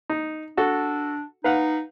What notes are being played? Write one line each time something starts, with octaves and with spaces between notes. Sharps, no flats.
D#4
D4 F#4 A4
D#4 B4 F5 F#5